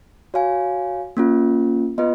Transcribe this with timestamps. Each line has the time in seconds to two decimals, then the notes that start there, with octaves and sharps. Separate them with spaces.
0.34 F#4 C#5 F5 G#5
1.17 A#3 C#4 F4
1.98 B3 F4 B4 D#5